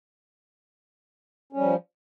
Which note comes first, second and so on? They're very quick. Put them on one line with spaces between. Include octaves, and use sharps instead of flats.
C#4 G3 F3